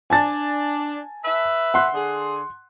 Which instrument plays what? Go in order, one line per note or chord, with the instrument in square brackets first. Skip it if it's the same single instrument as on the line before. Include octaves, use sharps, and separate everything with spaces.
[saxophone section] D4 [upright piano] G#5 A5 A6
[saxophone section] B4 E5
[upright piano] F#5 C6 F#6
[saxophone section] D3 G#4